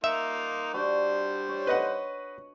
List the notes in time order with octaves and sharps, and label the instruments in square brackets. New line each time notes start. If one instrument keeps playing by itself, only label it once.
[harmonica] A#3 D#4 C6 [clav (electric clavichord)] E5
[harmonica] G3 C5 [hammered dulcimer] D4 F#4
[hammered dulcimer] C#5
[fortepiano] B4 D#5 F#5